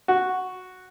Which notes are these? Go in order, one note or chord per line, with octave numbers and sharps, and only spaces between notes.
F#4